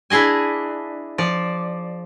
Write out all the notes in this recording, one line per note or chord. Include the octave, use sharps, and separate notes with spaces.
D4 E4 G#4 D#5 G#5
F3 D5